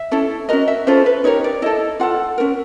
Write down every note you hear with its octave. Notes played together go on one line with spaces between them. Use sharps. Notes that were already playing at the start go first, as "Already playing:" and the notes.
Already playing: E5
C#4 E4 A4
C#4 F#4 A#4 D#5
E5
C#4 F4 A4 C5
B4
D#4 G4 A#4 C#5
D5
E4 A4 D#5
F4 A4 F#5
C#4 F#4 A#4